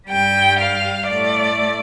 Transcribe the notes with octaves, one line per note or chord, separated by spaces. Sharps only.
G2 G3 G5
F5
A2 A3 D5